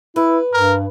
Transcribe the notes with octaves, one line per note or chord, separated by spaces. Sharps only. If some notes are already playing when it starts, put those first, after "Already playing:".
E4 B4
G2 A#4